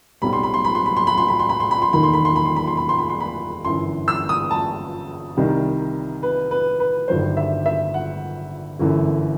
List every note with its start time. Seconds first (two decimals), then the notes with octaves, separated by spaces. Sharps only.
0.22 B1 B2 G3 C4 B5
0.33 C6
0.43 B5
0.54 C6
0.64 B5
0.75 C6
0.86 B5
0.97 C6
1.07 B5
1.18 C6
1.28 B5
1.39 C6
1.49 B5
1.60 C6
1.71 B5
1.82 C6
1.93 E1 D#2 D#3 A3 B5
2.03 C6
2.13 B5
2.25 C6
2.36 B5
2.45 C6
2.56 B5
2.67 C6
2.77 B5
2.89 C6
2.99 B5
3.10 C6
3.20 B5
3.65 G1 F#2 E3 C6
4.08 E6
4.29 D#6
4.51 A5
5.37 C2 C3 D#3 G3 D#4
6.23 B4
6.51 B4
6.80 B4
7.08 G1 G2 D#3 F#3 A3 C5
7.37 E5
7.66 E5
7.94 F#5
8.79 G1 F#2 E3 A3